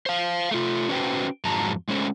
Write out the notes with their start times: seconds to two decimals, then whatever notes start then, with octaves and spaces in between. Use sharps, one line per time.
0.06 C5 F5
0.51 A3 F4
0.89 C#4 D4 F#4 B4 C5 G5
1.45 F2 G#2 F#3 G#3 A5 A#5
1.88 G#3 A3 C#4 C5